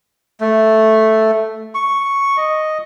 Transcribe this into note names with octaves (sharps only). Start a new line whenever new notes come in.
A3
C#6
D#5